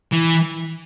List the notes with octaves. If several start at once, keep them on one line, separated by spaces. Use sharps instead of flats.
E3